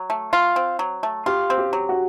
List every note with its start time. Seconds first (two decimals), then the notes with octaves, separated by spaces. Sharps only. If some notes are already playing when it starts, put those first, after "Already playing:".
Already playing: F#3
0.10 A3
0.33 F4
0.56 C4
0.79 F#3
1.03 A3
1.26 F4 G4
1.50 C4
1.58 G4
1.73 F#3
1.89 F#4